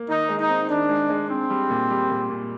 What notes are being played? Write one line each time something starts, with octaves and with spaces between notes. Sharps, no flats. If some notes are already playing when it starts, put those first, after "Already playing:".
Already playing: A#3
D#3 D#4
G#3
D#4
C4
D#3 D4
G#3
G#3
C4 D4
G3
A#2
G3
A#2
A#2